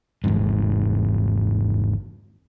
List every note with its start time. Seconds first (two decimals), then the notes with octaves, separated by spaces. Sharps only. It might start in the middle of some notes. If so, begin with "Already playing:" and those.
0.24 G#1 E2 G#2